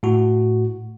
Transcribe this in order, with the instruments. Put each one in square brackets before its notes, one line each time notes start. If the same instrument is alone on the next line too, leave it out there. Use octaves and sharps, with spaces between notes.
[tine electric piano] A2 F#4